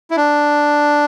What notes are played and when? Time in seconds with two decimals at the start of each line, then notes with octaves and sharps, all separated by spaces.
0.11 E4
0.17 D4